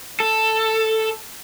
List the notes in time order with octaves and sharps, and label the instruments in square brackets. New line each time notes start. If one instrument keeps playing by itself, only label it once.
[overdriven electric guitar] A4